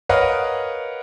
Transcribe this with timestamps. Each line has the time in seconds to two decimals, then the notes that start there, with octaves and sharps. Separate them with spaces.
0.09 A#4 B4 C#5 D#5 F5 F#5